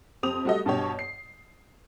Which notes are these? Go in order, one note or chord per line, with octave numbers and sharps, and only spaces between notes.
F2 C4 G4 D#6 F7
G3 A3 F#4 A4 D#5
G2 B2 G4 C#5
C7